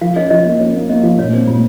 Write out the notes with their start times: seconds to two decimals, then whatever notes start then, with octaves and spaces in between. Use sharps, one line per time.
0.01 F3 F5
0.16 C#4 D#5
0.30 F3 D#5
0.45 A#3
0.60 C#4
0.75 A#3
0.89 A#3 D#5
1.03 F3 F5
1.18 A#2 C#5
1.33 C4
1.47 A#2 F4